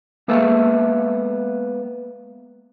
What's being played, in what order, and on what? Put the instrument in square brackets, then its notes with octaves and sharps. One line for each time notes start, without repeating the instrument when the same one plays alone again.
[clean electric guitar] G#3 A#3 B3 A4 E5